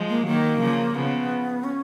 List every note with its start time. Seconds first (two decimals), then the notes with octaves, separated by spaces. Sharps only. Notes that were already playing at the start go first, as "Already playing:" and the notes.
Already playing: F3 G#3
0.09 A#3
0.26 D#3 F#3 A#3
0.60 C#3 F3
0.94 C#3 F3 B3
1.64 C#4